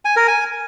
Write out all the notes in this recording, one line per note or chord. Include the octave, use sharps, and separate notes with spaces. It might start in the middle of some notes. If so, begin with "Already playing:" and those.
G#5
A#4
G#5